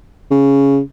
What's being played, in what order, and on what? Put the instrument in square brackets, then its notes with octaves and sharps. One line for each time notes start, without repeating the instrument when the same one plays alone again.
[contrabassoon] C#3